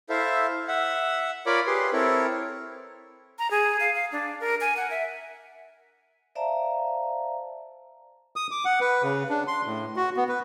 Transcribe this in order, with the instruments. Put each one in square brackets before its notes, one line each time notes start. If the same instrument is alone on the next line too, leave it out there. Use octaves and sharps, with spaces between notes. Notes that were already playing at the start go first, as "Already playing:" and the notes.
[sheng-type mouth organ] E4 A4 C5 E5 F5
E5 F#5
F4 A#4 C#5 D5 B5 D6
G4 G#4 B4 C6
C4 E4 A4 A#4 C#5
[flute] A#5
G#4
F5
F5
D4
A#4
G#5
F#5
E5
[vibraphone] C5 D5 E5 F5 A5 A#5
[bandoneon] D#6
D6
F#5
B4
C#3
D4
C6
A2
F#4
B3
B4